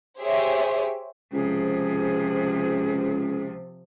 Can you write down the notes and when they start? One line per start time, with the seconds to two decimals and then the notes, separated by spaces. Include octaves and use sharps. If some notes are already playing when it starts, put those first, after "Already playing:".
0.20 G4 G#4 C5 C#5 E5
1.33 C#2 C3 F3 G#4